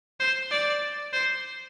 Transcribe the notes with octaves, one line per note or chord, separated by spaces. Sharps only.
C5
D5
C5